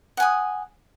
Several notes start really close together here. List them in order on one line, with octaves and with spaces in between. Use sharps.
F#5 G#5 D#6